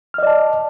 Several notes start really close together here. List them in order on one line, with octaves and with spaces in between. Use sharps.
F6 D#5 D5 A5